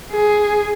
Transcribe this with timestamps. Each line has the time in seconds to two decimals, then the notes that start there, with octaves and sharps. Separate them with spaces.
0.12 G#4